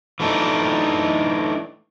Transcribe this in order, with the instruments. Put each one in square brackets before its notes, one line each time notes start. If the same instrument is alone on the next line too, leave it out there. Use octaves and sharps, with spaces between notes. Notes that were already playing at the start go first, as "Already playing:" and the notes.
[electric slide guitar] E3 A3 D4 D#4